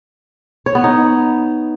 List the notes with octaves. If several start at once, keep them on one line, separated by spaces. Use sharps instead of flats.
C#5
B3
D#4